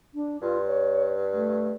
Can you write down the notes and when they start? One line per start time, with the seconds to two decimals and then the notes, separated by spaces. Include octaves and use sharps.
0.15 D4
0.42 G2 F4
0.67 C#5
1.34 A3